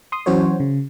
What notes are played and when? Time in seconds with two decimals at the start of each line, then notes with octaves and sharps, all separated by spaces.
0.12 C6 D#6
0.26 E3 F#3 C#4 F#4 C5 C#5
0.60 C#3